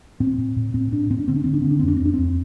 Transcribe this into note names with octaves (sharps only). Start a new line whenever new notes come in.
A2 C4
A2
A2
A2 C4
A2 D4
A2 C4
D4
D3 C4
D4
D3 C4
D4
D3 C4
D4
F2 C4
D4
C4
F2
D4
F2 C4